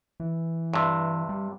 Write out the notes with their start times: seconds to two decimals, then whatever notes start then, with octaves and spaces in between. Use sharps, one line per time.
0.20 E3
0.74 G2 C3
1.29 G3